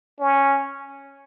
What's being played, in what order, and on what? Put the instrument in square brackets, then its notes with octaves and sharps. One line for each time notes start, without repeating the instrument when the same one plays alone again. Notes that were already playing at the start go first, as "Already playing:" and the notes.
[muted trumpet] C#4